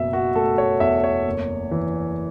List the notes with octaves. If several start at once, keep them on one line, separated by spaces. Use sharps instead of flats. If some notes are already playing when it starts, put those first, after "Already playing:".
Already playing: F#1 B2 E5
F#4
A3 A4
C#5
E2 E5
C#5
F#1
E3